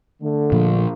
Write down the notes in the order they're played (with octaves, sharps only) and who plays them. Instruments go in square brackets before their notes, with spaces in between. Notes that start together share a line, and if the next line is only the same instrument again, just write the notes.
[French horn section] D3 A3
[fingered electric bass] A#2 F3